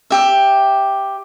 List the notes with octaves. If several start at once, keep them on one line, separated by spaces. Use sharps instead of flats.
G4 E5